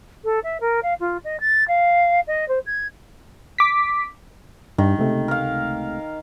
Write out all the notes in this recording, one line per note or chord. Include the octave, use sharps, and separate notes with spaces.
A4
E5
A#4
F5
F4
D#5
A6
F5
D#5
C5
G#6
D6 B6
G2 D#3
C#2 C3 A3
A#4 F5